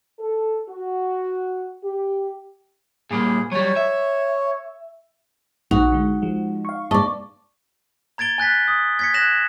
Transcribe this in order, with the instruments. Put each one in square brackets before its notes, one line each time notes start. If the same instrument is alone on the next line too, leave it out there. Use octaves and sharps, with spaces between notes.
[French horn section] A4
F#4
G4
[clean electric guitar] A#2 G3 A#3 [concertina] G#4
[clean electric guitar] F#3 G3 [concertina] C#5
[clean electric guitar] E5
[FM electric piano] A#1 [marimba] D#4 [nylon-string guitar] F#4
[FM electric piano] D3 G#3
F3 G#3
F5 C#6
[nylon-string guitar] D5 D#5 [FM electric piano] A5 [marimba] C#6
[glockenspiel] A#5 G#6 A6 D7 G7
G#5 F#6 A6 B6
D#6
G#6 B6 C#7
F#6 G#6 A#6 E7 F#7